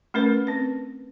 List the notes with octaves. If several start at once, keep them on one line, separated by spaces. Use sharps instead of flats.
A3 C#4 A#4 B4
C4 B4